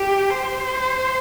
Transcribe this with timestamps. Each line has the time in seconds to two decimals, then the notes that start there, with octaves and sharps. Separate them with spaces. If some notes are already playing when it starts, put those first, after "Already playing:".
Already playing: G4
0.30 C5